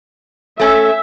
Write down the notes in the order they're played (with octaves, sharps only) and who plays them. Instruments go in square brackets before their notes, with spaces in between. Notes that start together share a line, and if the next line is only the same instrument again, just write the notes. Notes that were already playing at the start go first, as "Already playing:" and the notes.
[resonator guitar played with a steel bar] A3 C#4 [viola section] E5